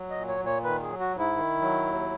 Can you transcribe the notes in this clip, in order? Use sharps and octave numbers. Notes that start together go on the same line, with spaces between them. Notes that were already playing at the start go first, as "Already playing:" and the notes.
Already playing: F#3
D#5
A#2
C#5
A#2
C#5
D#3 B4
G#4
F#3
F#4
G#2
E4
D#3
F#3
D#2